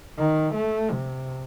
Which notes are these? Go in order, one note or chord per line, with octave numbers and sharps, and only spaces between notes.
D#3
A3
C3